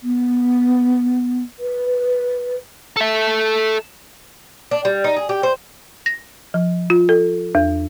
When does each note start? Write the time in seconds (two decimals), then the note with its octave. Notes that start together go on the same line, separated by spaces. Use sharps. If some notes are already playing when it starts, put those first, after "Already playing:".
0.01 B3
1.59 B4
2.97 A4 E5
4.71 D4
4.85 G3
5.04 D#4
5.16 G#4
5.29 G4
5.43 C5
6.06 A#6
6.54 F3
6.90 F4
7.09 A4
7.55 E2